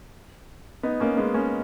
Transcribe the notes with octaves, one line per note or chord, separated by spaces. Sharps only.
B3 D#4
A#3 C#4
G#3 B3
A#3 C#4